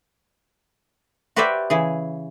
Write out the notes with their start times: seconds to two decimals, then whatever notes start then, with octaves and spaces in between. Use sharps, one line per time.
1.36 F#4 G4 B4 C5 D5 E5
1.70 C#3 E3 G#4